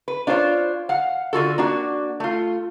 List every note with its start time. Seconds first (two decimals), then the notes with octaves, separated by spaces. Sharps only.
0.08 B4
0.27 D4 F4 A4 C5 C#5
0.89 F5 F#5
1.33 D3 F4 F#4 A4
1.58 A#3 D4 F#4
2.20 A3 F4